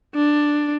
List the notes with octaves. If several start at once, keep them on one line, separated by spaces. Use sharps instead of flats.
D4